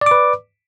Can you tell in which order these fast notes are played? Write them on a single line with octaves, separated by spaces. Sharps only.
D5 D6 B4